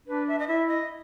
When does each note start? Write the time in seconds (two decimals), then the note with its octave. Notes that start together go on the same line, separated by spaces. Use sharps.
0.07 D4 B4
0.28 E5
0.39 D#5
0.48 E4 E5
0.68 D#5